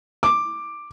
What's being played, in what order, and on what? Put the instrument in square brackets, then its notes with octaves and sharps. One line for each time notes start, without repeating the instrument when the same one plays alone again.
[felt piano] D6